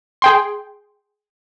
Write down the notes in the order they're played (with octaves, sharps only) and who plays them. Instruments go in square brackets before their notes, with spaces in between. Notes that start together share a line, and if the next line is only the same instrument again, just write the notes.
[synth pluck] G#4 G5 C6